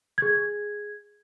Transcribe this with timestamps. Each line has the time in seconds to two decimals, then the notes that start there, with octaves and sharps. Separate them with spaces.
0.18 G#4 G#6